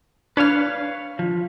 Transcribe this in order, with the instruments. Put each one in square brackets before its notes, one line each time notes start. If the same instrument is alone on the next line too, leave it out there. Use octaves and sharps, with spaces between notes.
[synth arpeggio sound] D4 F6 [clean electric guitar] B4 C#5 F5
[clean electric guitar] F3